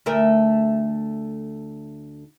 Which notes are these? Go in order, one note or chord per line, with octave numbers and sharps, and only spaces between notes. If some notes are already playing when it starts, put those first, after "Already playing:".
D2 A3 A#4